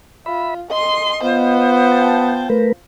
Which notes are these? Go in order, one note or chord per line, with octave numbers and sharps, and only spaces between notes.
F4 E5 B5
D#5 C6
B3 F4 C5
G5 A5
A3 A#4 B4